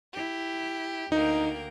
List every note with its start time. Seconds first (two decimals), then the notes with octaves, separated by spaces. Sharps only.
0.13 E4 G4
1.12 D2 A#3 D#4 G5